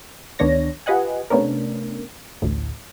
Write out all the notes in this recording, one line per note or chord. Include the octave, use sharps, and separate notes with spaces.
D2 D#3 B3 D4 C#5 A#6
F4 G4 B4 D#5 F#5 G#5
C3 A3 B3 C#4 D4 A#4
A1 D2 A2